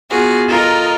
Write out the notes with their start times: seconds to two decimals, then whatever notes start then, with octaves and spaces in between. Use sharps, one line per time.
0.11 B3 F4 F#4 G#4
0.48 F4 A4 A#4 D#5 A#5